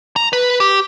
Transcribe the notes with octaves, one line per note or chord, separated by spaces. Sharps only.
A#5
B4
G4